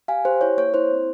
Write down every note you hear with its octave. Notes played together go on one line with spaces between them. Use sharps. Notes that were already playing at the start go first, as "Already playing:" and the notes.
G4 F5 G#5
G4 C5
E4 C#5
A#3 C#5
E4 C5
C4